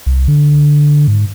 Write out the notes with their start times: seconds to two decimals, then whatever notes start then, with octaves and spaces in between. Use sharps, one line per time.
0.06 C2
0.28 D3
1.08 G#2